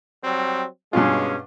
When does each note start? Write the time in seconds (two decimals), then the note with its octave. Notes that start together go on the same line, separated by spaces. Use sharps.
0.24 F#3 G3 C4
0.93 G2 B2 G#3 C#4 F4